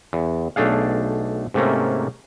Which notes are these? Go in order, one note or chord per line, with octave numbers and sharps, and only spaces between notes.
E2
B1 A3 D4 G#4 F5
G#2 C3 A3 A#3 C#4